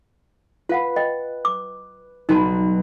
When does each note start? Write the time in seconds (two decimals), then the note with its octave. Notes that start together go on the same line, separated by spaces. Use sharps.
0.69 F4 B4 F5 F#5
0.96 D#5 G5
1.45 D6
2.29 B1 G3 D#4 F#4 B4 A5